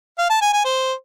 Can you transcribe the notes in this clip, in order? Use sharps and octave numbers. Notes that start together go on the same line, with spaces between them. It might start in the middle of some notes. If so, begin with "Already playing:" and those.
F5
A5
G#5
G#5
C5